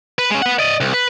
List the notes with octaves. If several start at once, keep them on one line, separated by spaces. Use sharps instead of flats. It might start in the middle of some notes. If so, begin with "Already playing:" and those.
B4
G#3 C#4
B4 F#5
D5 D#5
C2
B4